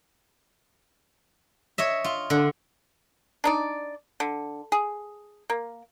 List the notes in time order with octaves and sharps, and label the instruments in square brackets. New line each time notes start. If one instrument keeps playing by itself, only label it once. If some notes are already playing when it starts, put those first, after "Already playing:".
[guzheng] C#5 D#5 E5
F4
D3
[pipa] D4 D#4 D5
D3
G#4
A#3